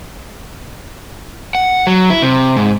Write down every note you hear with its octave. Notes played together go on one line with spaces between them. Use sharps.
F#5
F#3
E4
C3
G#2